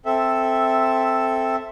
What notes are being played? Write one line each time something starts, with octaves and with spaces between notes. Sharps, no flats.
C4 A4 E5